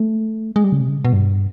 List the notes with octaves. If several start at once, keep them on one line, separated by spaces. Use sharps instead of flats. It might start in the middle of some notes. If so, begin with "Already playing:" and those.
Already playing: A3
G#3
G3
C#3
C3
C#3
B2
G2